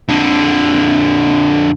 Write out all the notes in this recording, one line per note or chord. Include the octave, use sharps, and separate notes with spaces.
F2 D3